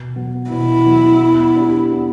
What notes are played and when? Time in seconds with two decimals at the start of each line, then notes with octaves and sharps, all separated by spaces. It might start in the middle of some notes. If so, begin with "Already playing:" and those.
Already playing: B2
0.16 F#3 B3
0.50 B2 E4
0.86 F#3 B3
1.21 B3
1.56 D4 G4
1.92 B3